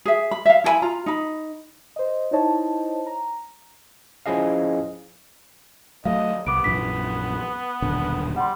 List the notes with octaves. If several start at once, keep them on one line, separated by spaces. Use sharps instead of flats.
G#4 E5
B5
E5 F5
E4 A4 G#5 B5
F4 A#5
D#4 B5
C5 D#5
D#4 E4 C5 C#5 D#5 A5
A#5
F3 C#4 E4 G#4 D#5 F5
F#3 A3 D#5 F5
C2 B3 D6 D7
A#1 F#2 E3 B6
D#1 B1 D3
G3 F#5 C6